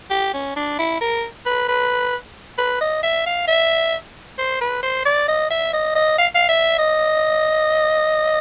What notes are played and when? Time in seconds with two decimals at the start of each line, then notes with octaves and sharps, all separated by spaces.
0.10 G4
0.34 C#4
0.56 D4
0.78 E4
1.01 A#4
1.46 B4
1.68 B4
2.58 B4
2.81 D#5
3.03 E5
3.26 F5
3.48 E5
4.38 C5
4.61 B4
4.83 C5
5.05 D5
5.28 D#5
5.51 E5
5.73 D#5
5.95 D#5
6.18 F5
6.35 F5
6.48 E5
6.78 D#5